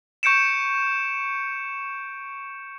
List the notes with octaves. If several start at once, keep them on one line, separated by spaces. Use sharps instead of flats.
C#6 G6 C#7 D7 E7